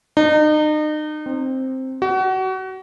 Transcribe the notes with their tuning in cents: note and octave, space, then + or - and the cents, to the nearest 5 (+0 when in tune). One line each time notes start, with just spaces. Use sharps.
D#4 -35
C4 +5
F#4 +30